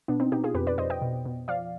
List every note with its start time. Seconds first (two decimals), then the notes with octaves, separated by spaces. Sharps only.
0.08 B2 B3 D4
0.20 C4 D#4
0.32 B2 D#4 G4
0.44 F4 G#4
0.55 F2 G4 B4
0.67 B4 D5
0.78 F2 C5 D#5
0.90 D#5 G5
1.02 B2
1.26 B2
1.48 F3 D5 F5